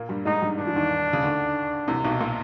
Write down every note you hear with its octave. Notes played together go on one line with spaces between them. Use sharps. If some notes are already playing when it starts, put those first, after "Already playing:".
Already playing: A#2 A#3
G2 G3
G#2 G#3 D#4
G2 G3
D#3 D4
E3
D#2 D#3
C#3
D2 D3
C2 C3
B1 B2
A#2